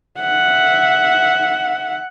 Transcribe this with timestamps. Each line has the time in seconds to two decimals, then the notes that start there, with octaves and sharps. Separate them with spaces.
0.20 E5 F#5